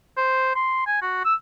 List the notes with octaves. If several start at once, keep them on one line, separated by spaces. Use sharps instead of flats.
C5
C6
G#5
F#4
E6